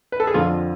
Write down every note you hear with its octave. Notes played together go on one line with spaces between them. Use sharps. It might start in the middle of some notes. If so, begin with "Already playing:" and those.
B4
A4
G#4
F2 D3 F3 F4